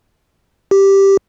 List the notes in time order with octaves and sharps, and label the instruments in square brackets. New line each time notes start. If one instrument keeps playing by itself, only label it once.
[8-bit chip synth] G4